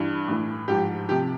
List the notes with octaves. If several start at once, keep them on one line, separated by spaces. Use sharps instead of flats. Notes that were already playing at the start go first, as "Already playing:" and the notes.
Already playing: G2 E3
A2 E3
G#2 F3 G4
C3 F3 G4